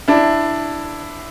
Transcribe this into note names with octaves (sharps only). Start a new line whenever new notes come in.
D4 E4